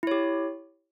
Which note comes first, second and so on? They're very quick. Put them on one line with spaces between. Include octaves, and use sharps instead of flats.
E4 C#5 G4